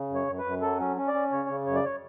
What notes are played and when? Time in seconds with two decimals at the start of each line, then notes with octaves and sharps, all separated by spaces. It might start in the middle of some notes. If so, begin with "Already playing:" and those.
Already playing: C#3
0.10 F#2
0.15 C#5
0.27 F#2
0.38 B4
0.44 F#2
0.61 F#3 A4
0.79 C#4
0.97 C#4
1.08 D5
1.13 C#4
1.32 C#3 C#5
1.49 C#3
1.66 F#2 C#5
1.76 D5
1.85 C#5